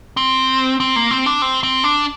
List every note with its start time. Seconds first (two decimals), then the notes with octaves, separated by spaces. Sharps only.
0.17 C4
0.80 C4
0.96 A#3
1.11 C4
1.26 D4
1.42 C4
1.63 C4
1.84 D4